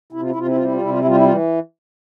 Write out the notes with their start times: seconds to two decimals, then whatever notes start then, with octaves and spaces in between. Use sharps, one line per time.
0.12 C3 E4
0.22 F4
0.30 E4
0.36 C3 F4
0.47 E4
0.55 G3 F4
0.64 E4
0.73 F4
0.81 C3 E4
0.90 F4
0.98 E4
1.04 G3 F4
1.15 E4
1.24 E3 F4